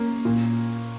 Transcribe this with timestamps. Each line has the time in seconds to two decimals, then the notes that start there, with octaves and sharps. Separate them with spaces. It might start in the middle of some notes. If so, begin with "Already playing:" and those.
Already playing: A#3 C#4
0.25 A#2